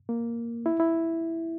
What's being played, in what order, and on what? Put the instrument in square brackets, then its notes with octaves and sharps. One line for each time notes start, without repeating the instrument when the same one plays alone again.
[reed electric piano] A#3
E4
E4